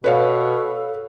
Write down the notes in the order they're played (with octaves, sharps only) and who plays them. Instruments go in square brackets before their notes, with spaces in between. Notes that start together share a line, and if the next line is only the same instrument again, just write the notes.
[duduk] B2 [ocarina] A4 [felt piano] B4 C#5 F5